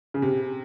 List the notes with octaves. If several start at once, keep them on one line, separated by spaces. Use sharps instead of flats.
C#3
C3